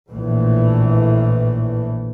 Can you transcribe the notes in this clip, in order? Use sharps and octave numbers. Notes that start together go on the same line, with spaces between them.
A#1 A2 E3 A3